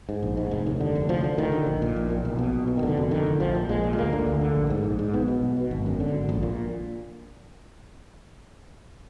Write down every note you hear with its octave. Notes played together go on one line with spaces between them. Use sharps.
G#2
A#1
G#2
F1
D#2
D3
F1
D2 F3
D3
D2 D#3
D3
A#1
A#2
A#1
A#2
B1
B2
B1
B2
D#3
F1 D3
F2
D3 D#3
F1
A#1 F3
A#2
A#1 G#3
A#2
G#3
D2 A#3
D3
D2
D3
A#1
G#2
A#1
G#2
B1 B3
B2
B1
B2
G#1
F#2
D3
G#1
A#1
A#2